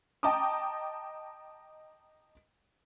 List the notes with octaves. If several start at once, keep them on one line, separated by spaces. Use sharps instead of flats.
D#5 G5 A5 A#5 D6 D#6